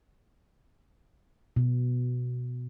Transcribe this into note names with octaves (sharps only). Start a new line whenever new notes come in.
B2